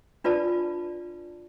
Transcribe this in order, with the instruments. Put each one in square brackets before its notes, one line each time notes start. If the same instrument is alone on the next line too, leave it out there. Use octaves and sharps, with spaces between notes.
[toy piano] D4 F4 B4 D5 A5